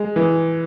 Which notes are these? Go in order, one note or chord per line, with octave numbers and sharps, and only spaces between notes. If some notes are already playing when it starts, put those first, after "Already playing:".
Already playing: G#3
E3